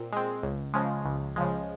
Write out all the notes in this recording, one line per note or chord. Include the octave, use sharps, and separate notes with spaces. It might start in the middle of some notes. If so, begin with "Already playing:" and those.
Already playing: A#2 C4
G#3 C4
C#2
C#3 F3 G#3
C#2
C#3 F3 G#3